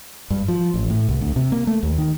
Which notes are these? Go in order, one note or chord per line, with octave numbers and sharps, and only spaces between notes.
G2
F3
A1
A2
C2
D2
C3
A#3
A3
D#2
D#3